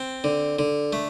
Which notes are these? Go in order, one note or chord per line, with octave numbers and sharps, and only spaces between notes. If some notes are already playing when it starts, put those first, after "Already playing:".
Already playing: C4
D3
D3
A3